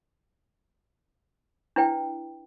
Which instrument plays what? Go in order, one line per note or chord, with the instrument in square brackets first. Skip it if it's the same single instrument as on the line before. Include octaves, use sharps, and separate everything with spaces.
[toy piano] D4 E4 B4 G5